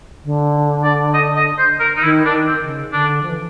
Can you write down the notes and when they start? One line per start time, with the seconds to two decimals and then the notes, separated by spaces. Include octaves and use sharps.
0.24 D3
0.84 D5
1.14 D#5
1.36 D#5
1.58 C5
1.80 A#4
1.96 D#4
2.02 D#3 E4
2.26 D4
2.32 D#3
2.47 C4
2.62 C#3
2.92 D3 D4
3.23 F3
3.30 E3